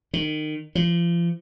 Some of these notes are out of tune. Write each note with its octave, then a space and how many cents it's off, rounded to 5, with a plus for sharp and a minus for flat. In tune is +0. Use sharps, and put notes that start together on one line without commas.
D#3 -25
F3 -35